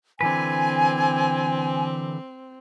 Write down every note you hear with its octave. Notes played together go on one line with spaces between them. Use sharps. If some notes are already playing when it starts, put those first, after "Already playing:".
D3 E3 C4 B4 G#5